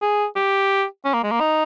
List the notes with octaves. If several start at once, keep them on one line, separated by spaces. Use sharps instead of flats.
G#4
G4
C#4
A#3
G#3
A#3
D#4